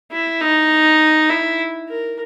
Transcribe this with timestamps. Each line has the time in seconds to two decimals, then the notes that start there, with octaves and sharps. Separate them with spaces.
0.12 E4
0.41 D#4
1.30 E4
1.88 A#4